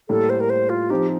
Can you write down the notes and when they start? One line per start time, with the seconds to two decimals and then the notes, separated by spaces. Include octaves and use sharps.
0.09 A2 G3 A#3 A4
0.30 C5
0.40 A#4
0.50 C5
0.70 F4
0.90 F3 C4 D#4 G4